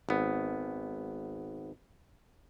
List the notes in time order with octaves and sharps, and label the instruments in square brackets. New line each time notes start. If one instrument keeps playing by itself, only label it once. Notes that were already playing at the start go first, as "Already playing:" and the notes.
[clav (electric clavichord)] G#1 B3